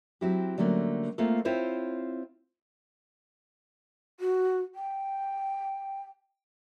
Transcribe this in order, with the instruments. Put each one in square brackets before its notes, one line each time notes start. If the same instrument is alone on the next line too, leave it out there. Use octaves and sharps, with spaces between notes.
[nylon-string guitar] F#3 C4 E4 F#4 G4
D3 F#3 G3 A3 A#3 C#4
A3 A#3 C4 F4 A4
C4 E4 F4 C5 C#5
[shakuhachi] F#4
G5